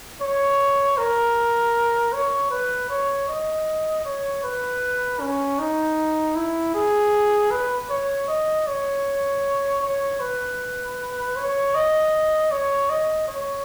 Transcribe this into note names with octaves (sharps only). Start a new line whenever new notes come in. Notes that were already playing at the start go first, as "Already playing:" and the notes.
C#5
A#4
C#5
B4
C#5
D#5
C#5
B4
C#4
D#4
E4
G#4
B4
C#5
D#5
C#5
C#5
B4
C#5
D#5
C#5
D#5
C#5